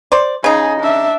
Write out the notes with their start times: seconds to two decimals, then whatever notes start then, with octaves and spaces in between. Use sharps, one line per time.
0.12 C5 D5
0.44 C#3 D#4 G#4
0.80 D4 E5